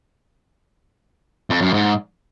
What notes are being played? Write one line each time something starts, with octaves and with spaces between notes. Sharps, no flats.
F2
F#2
G#2